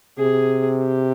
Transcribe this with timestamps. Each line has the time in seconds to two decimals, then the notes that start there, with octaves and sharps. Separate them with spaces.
0.18 C3 G#4
0.83 G4